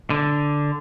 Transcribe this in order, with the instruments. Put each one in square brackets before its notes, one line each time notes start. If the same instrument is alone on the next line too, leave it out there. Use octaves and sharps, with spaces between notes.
[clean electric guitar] D3